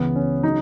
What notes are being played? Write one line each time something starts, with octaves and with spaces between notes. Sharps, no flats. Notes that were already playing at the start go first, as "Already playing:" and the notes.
Already playing: C#2 C#3 E3 B3
C#4
C#3 F#3 D#4